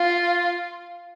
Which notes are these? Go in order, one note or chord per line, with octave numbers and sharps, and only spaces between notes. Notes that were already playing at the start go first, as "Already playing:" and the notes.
Already playing: F4